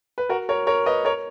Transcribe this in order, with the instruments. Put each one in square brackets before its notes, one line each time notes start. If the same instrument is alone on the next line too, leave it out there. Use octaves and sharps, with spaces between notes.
[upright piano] B4
F#4 A#4
A#4 C#5
A#4 C#5
B4 D#5
A#4 C#5